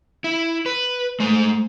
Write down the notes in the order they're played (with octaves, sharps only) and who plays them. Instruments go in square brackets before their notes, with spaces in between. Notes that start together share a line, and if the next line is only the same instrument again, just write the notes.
[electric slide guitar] E4
B4
[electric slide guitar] G#3 C5 [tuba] A3